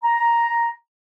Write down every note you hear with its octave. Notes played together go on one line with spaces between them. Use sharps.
A#5